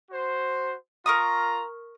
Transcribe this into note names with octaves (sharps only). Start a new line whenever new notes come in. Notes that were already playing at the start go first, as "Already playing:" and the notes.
F#4 C5
F4 A#4 A#5 C#6 D#6